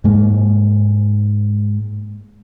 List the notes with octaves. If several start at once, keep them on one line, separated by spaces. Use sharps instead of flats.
G#2 G#3 A#3